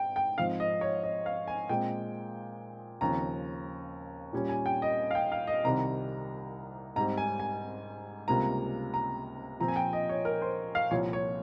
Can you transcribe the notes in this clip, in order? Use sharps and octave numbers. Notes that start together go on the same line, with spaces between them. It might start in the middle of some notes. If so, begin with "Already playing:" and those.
Already playing: G#2 G5
G5
G#2 F3 C4 F5
D#5
C#5
D#5
F5
G#5
A#2 G#3 C4 G5
D#2 C#3 F3 C4 A#5
A#2 G3 C#4
G#5
G5
D#5
F5
G5
F5
D#5
C2 C3 D#3 G3 A#5
G#2 G3 C4 A#5
G#5
G#5
C#2 C3 G3 A#3 A#5
A#5
A#2 F3 C4 A#5
G#5
G5
D#5
C#5
A#4
C5
F5
C2 A#2 F3 C4 C#5
C#5